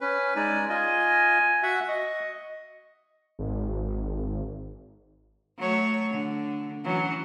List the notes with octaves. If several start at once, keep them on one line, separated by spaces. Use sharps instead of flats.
C#4 B4
G#3 D#4 D5 G#5
F4 D#5 G#5
F#4 E5 F#5
D#5 C#6
G#1
F#3 A3 C#5
D3
E3 F#3 C#4